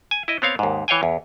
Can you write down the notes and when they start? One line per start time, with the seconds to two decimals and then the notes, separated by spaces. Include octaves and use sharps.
0.11 G#5
0.28 E4 D#5
0.42 B3 C4 C#5 F5
0.59 D#2 G#2
0.88 E3 C#5 F5 G5 G#5
1.03 E2